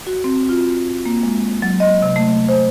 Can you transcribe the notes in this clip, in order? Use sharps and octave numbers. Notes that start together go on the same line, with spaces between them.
F#4
C4
F4
A#3
G#3
F#3
D#5
C3
A3
C5